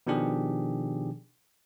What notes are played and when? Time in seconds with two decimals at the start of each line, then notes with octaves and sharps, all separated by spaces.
0.07 B2 D#3 F3 D4 G4 G#4